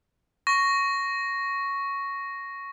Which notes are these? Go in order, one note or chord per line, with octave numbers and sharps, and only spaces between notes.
C#6 A#6